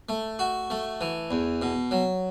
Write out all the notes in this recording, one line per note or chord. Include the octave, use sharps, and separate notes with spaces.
A3
F#4
A3
E3
E2
B2
F#3